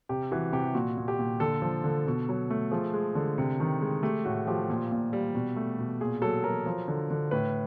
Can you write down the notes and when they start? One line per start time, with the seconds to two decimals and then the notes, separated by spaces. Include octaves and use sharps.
0.09 C3 G4
0.31 E3 F#4
0.52 C3 G4
0.74 A#2 F#4
0.97 A#2
1.08 G4
1.19 A#2
1.40 D3 A4
1.62 F3
1.84 D3
2.07 B2
2.29 F#3
2.50 A3
2.71 F3 G#4
2.94 G#3
3.15 D3
3.38 C3
3.60 D#3
3.81 G#3
4.03 A3 G4
4.25 A2 F#4
4.47 F3 G4
4.70 A#2
4.92 A#2
5.13 G3
5.35 B2
5.56 A3
5.79 B2
6.01 A#2 G#4
6.22 F#3 A4
6.44 F#3 A#4
6.66 F3
6.88 D3
7.10 D3
7.31 A2 B4